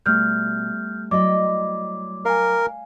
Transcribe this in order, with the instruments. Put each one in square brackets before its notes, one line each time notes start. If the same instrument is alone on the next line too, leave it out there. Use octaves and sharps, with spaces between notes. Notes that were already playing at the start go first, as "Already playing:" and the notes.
[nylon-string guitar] B2 [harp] G3 A3 [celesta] F6 G6
[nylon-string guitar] F#3 E4 [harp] D5 D#5 B5 [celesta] D6
[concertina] A#4 [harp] F5 G#5